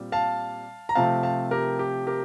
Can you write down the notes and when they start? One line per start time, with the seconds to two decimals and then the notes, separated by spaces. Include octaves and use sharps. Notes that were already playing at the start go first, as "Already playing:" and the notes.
Already playing: A#2 G3 C4
0.12 F5 A5
0.89 A#5
0.95 C3 F3 A3 C4 F5 A5
1.23 F5 A5
1.51 G4 A#4
1.79 G4
2.07 G4 A#4